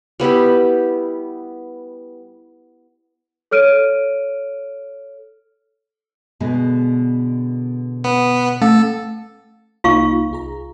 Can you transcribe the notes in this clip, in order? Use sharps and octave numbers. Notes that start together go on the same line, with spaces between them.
G3 B3 E4 G4
A4 C#5 F6 D7 D#7
B2 D3 G#3
B3
A3 A4
C2 A#3 D#4 F4 F5 C#6
C2 G#4 A#5